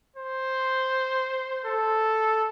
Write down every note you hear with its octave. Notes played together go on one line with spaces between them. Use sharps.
C5
A4